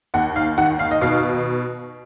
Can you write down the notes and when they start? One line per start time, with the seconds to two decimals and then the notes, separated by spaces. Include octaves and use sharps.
0.14 D#2 F#5
0.36 F5
0.58 D#3 F#5
0.79 F5
0.91 D#5
1.01 B2 F5